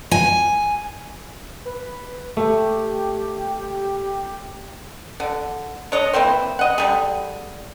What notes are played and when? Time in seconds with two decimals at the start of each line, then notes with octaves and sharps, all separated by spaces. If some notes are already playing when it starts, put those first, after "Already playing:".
0.11 G#5
1.65 B4
2.37 A3 G4
5.20 D3
5.92 D4 C#5 D#5
6.13 E3 A#3 C4 C5
6.59 D#5 F#5
6.78 D3 G3 G#4